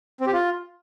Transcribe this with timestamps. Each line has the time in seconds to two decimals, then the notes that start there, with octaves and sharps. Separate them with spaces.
0.21 C4
0.27 G4
0.33 F4